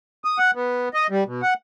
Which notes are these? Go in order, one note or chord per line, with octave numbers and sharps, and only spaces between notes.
D#6
F#5
B3
D#5
G3
B2
F#5